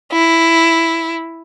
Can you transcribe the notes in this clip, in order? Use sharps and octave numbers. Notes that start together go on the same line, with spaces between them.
E4